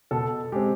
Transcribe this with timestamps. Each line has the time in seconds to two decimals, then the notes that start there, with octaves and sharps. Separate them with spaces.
0.11 B2 A4
0.52 G#3 C4 G4